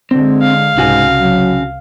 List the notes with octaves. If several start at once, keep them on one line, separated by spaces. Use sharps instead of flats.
D3 G#3 C4
F5
C2 G#2 C#3 F#4 G#5
F#3